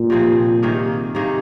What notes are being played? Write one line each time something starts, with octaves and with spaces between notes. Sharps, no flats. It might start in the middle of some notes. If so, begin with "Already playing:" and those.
Already playing: A#2
C3 F3 C4 G#4
C3 D#3 A#3 G#4
C3 D#3 A#3 G#4